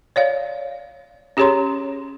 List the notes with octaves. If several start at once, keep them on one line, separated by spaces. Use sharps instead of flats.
C#5 D5 F5
C#4 G4 G#4 C#5 A#5 C6